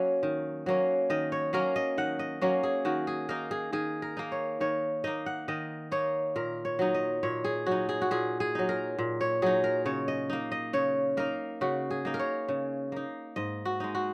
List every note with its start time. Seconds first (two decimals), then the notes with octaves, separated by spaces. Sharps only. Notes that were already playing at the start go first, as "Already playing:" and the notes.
Already playing: F#3 A#3 C#4
0.23 D#3
0.66 F#3 A#3 C#4
1.10 D#3 D#5
1.32 C#5
1.53 F#3 A#3 C#4 A#4
1.76 D#5
1.98 D#3 F#5
2.19 D#5
2.41 F#3 A#3 C#4
2.63 G#4
2.85 D#3 F#4
3.07 G#4
3.29 A#3 D#4 A#4
3.51 G#4
3.73 D#3 G#4
4.02 A#4
4.17 A#3 D#4
4.32 C#5
4.60 D#3 C#5
5.04 A#3 D#4 D#5
5.26 F#5
5.48 D#3 D#5
5.92 A#3 D#4 C#5
6.36 A#2 A#4
6.65 C#5
6.79 F#3 D#4
6.94 D#5
7.23 A#2 C#5
7.44 G#4
7.66 F#3 D#4 F#4
7.89 G#4
8.02 F#4
8.11 A#2 G#4
8.40 G#4
8.55 F#3 D#4
8.69 A#4
8.99 A#2
9.21 C#5
9.42 F#3 D#4 G#4
9.64 A#4
9.86 C#3 C#5
10.08 D#5
10.30 A#3 D#4
10.52 D#5
10.73 C#3 C#5
11.17 A#3 D#4 A#4
11.61 C#3 F#4
11.91 G#4
12.05 A#3 D#4
12.14 A#4
12.19 C#5
12.48 C#3
12.92 A#3 D#4
13.36 G#2 D#5
13.65 F#4
13.80 G#3 D#4
13.95 F#4